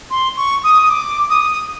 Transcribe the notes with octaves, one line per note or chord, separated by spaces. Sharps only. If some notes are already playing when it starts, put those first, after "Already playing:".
C6
C#6
D#6
D#6
D6
D#6